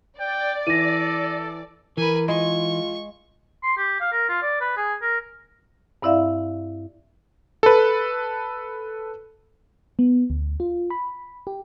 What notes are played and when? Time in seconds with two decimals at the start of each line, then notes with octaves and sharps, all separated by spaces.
0.20 D5 G5
0.67 E3 A4 A#6 D#7
1.97 E3 A#4 B4 G#5
2.28 G#3 F4 C#6
3.63 C6
3.77 G4
4.00 F5
4.12 A#4
4.29 F4
4.42 D5
4.61 B4
4.77 G#4
5.02 A#4
6.02 G2 C4 E4 D5 E5 F5
7.63 A4 B4
9.99 B3
10.30 D2
10.60 F4
10.90 B5
11.47 G4